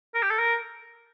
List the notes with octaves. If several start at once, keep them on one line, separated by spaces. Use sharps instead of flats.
A#4
G4
A4
A#4